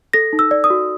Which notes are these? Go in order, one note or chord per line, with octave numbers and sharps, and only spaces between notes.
A4 A#6
D#4
E6
D5
D#6
F#4